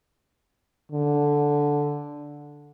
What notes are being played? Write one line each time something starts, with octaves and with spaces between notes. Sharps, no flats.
D3